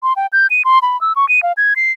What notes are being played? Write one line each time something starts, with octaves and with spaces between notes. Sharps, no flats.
C6
G5
G6
D#7
C6
B5
E6
C#6
D#7
F5
G#6
C7